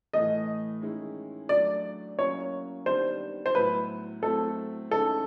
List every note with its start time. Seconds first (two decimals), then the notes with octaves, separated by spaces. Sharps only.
0.13 A2 E3 A3 D#5
0.81 D#3 G#3 C#4 E4
1.49 F#3 A3 D4 D5
2.18 F#3 A#3 C#4 E4 C#5
2.86 D#3 G3 B3 D4 C5
3.46 C5
3.55 A2 F#3 B3 E4 B4
4.22 F#3 A3 C4 E4 A4
4.91 D#3 G#3 C#4 E4 A4